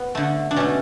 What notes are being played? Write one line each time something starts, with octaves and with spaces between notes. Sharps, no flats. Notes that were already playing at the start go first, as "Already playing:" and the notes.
Already playing: B3
D3 A3
D4
B2 A3 C#4